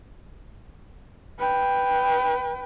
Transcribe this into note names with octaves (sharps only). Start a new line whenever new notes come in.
B4 G5